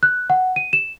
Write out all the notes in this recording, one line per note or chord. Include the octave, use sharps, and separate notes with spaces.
F#6
F#5
D#7
E7